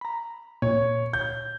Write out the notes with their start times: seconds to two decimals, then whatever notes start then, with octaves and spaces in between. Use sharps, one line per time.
0.01 A#5 B5
0.62 A#2 C#5
1.13 G6